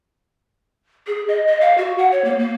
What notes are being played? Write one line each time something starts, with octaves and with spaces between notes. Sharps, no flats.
G#4
D#5
D#5
F5
F#4
F#5
C#5
A#3
A#3